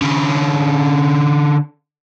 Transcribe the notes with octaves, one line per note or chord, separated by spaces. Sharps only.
D3 C#4